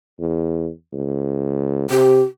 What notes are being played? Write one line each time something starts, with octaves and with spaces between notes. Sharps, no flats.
E2
C#2
C3 G4